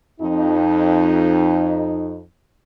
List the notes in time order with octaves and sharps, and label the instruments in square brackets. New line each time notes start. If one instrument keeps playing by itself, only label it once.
[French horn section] F2 D#4